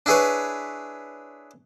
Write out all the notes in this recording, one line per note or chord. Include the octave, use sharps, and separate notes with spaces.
D4 E4 G#4 B4 C#5